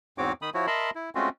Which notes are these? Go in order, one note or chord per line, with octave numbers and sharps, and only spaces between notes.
E2 G#2 C4 F#4 C#5 D6
D#3 B5 D#6
F3 E4 F#4 C#5
A#4 D#5 E5 A5 B5 C6
E4
G#3 A3 C4 C#4 F4 F#4